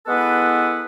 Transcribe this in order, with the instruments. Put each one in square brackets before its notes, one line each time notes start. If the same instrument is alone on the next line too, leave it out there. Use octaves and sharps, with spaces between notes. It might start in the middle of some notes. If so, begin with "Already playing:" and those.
[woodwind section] G#3 B3 E4 F#4 A4 B4